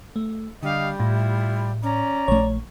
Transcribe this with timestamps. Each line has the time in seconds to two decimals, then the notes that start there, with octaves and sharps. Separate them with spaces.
0.16 A3
0.63 D3 G3 G4 D#5 F5
1.00 A2 E4 F4
1.83 C#4 D5 A#5
2.28 A#1 A3 C#5